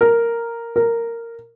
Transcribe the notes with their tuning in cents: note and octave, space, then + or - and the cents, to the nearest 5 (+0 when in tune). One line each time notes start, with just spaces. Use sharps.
A#4 -5
A#4 -10